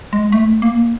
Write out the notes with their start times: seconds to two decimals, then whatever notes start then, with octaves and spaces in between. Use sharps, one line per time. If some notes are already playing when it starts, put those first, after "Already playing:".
0.13 G#3
0.32 A3
0.62 A#3